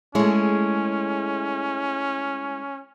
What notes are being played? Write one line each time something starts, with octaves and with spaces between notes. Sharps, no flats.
G#3 A3 C#4 E4 G#4 C#5